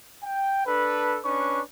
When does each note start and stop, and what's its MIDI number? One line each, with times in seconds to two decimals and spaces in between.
0.24 0.62 79
0.66 1.17 62
0.66 1.17 69
0.66 1.17 71
1.25 1.61 61
1.25 1.61 62
1.25 1.61 71
1.25 1.61 85